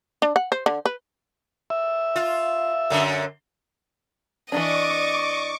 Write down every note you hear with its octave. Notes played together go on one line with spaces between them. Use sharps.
D4
F#5
C5
D3
B4
E5
F4
F#2 D3
E3 F3 D4 D5 D#5 C#6 D6